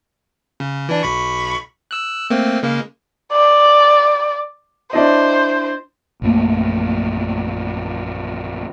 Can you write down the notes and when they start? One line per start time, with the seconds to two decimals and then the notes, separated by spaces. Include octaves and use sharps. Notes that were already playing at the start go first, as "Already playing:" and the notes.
0.60 C#3
0.89 E3 D4
1.03 B1 B5 C#6
1.91 E6 F#6
2.30 A3 A#3 C4
2.63 C#3 G#3 A#3
3.32 D5
4.93 D4 E4 C5 D#5
6.22 A#1 F#2 A3 A#3